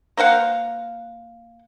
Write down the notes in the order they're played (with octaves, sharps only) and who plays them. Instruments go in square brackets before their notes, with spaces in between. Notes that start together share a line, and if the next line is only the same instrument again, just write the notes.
[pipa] A#3 C5 F5 F#5